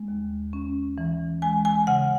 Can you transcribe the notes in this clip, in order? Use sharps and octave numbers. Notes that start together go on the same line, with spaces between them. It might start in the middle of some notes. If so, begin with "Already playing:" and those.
Already playing: G#3
D#2
C#4
E3
G#3 G#5
G#5
C#3 F#5